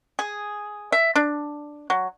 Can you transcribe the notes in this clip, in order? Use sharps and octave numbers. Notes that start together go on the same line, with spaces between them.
G#4
E5
D4
F#3